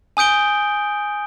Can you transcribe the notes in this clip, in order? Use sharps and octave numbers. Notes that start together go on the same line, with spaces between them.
G#5 D#6 G6 D7 G7